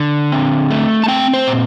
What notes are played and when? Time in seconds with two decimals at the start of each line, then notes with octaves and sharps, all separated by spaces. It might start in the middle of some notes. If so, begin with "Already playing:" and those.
Already playing: D3
0.32 C4
0.71 A3
1.04 A5
1.08 C4 G5
1.33 C5
1.47 A#2